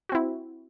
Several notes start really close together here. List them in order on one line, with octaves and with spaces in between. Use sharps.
F#4 C4 E4